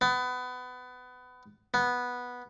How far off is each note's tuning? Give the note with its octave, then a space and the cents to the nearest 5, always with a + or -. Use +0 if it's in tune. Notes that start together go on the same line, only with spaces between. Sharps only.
B3 +25
B3 -5